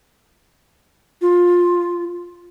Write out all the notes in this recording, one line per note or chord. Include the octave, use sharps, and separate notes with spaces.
F4